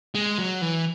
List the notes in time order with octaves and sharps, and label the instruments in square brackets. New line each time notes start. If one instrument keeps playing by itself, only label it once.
[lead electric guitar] G#3
F#3
E3